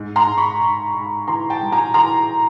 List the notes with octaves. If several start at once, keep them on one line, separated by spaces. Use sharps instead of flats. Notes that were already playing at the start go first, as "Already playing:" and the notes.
Already playing: G#2
A#5 C6
G#2
B5 C#6
G#2
G#2
E3 A#5 C6
G5 A5
G3
G#5 A#5
E3 A#5 C6